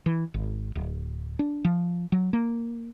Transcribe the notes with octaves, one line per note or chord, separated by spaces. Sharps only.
E3
G#1
D1
D4
F3
F#3
A#3